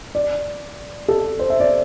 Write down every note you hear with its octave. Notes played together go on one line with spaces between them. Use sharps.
D5
A4
C5
E5
D5